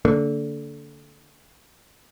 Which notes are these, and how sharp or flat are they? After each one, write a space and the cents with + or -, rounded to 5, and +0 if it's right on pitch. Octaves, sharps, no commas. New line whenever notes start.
D3 -15 A#3 -35